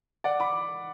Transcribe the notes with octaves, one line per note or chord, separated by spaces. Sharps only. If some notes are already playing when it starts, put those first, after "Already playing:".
D5 F#5
B5 D6